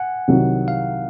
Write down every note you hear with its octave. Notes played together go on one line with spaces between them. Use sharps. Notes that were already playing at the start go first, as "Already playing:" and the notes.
Already playing: F#5 G#5
C2 C3 D#3 F#3
F5